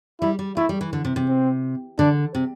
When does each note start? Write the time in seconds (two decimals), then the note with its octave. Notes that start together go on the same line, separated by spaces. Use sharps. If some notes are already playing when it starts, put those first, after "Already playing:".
0.21 G3 E4
0.39 G3
0.56 A3 E4
0.69 G3
0.81 E3
0.93 D3
1.05 C3
1.16 C3
1.28 C4
1.98 D3 D4
2.35 C3